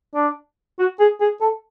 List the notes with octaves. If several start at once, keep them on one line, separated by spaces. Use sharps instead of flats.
D4
F#4
G#4
G#4
A4